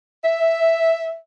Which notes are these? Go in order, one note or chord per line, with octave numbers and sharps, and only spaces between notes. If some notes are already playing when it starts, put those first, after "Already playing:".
E5